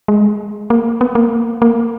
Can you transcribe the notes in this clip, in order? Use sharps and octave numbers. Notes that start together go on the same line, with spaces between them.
G#3
A#3
B3
A#3
A#3